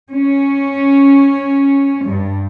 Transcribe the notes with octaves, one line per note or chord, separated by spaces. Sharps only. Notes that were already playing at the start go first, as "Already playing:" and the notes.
C#4
G2